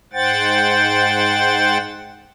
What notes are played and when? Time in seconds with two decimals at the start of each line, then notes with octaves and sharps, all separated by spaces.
0.13 G#2 C5 F#5 G5 A6